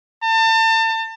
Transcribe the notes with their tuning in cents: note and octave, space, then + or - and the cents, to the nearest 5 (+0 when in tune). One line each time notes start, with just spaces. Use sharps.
A5 +35